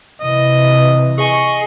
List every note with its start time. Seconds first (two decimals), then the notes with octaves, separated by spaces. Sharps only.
0.20 C3 E3 D#5
1.18 G#4 D#5 G#5 C#6